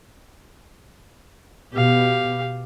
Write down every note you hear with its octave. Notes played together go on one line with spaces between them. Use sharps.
B2 G4 F5